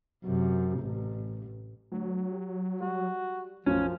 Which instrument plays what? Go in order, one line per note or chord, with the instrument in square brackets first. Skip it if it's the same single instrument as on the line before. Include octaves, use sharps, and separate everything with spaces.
[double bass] F#2 C3
A1
[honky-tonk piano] D2 [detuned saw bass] F#3
[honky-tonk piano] G4
[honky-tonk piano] G3 [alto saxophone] F#4
[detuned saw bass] B1 [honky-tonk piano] F#2 A2 [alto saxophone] F3 [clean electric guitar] C#4